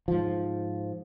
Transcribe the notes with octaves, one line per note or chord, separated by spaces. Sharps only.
G#2 F3